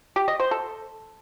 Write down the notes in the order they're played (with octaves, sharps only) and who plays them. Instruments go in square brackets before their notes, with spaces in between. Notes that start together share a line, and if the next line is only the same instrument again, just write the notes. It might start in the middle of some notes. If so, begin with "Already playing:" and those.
[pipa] G4
D#5
C5
A4